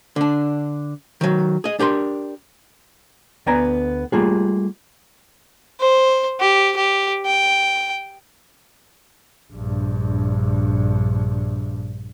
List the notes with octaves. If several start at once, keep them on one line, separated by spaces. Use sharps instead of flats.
D3 D4
D#3 F#3
G#4 D#5
D4 G4 A#4 C6
D2 B3 D5 G#5 A#5
G3 A3 A#3 F4 G#4
C5
G4
G4
G5
A#1 G2